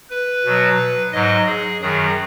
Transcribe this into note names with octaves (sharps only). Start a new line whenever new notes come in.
B4
B2 F#3
G#2 F#3 D#5
G#4
F#2 D#3 F#3 G#4